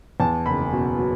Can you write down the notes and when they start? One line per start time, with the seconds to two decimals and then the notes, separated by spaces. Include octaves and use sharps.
0.20 E2 A5
0.46 F#1 B5
0.73 B2
0.99 F#3